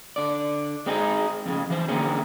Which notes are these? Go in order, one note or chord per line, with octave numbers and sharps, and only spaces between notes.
D3 D5
G#3 C4 D#4 G#4
F2 A2 C#3
E3 C5
D3 A#3 C4 C#4 G#4